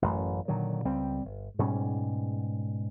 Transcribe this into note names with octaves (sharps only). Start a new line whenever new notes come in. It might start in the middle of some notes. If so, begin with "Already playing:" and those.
A1 F#2 A3
A#2 D3 D#3 F#3
C#2 G3 C4
G1
G#2 B2 G3 C#4